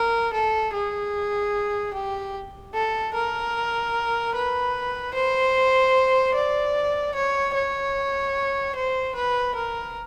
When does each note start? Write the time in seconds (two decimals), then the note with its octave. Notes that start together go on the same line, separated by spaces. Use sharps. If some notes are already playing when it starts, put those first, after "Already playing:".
Already playing: A#4
0.33 A4
0.73 G#4
1.93 G4
2.74 A4
3.13 A#4
4.34 B4
5.14 C5
6.34 D5
7.15 C#5
7.54 C#5
8.75 C5
9.15 B4
9.55 A#4